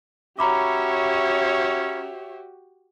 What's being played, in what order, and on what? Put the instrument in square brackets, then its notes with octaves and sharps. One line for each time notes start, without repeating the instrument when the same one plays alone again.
[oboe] C#4 [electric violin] F#4 G4 [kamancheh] C#5 E5 [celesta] A#5 B5 D6